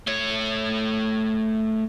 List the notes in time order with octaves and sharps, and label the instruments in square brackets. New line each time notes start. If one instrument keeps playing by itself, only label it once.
[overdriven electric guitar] A3 C#5